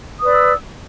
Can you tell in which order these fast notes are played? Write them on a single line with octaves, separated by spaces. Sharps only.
D#6 B4 D5 E6